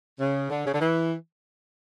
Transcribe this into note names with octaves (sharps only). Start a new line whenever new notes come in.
C#3
D3
C#3
D3
E3